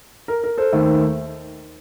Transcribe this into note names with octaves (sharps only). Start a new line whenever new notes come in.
A#4
A#4
A4 C5
D#2 D#3 A3